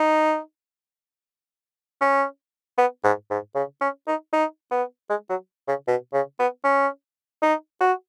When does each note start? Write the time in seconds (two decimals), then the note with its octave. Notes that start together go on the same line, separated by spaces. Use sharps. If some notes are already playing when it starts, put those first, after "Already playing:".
Already playing: D#4
2.01 C#4
2.78 B3
3.04 G#2
3.30 G#2
3.55 C#3
3.81 C#4
4.07 D#4
4.33 D#4
4.71 B3
5.10 G#3
5.29 F#3
5.68 C#3
5.87 B2
6.13 C#3
6.39 B3
6.64 C#4
7.42 D#4
7.81 F#4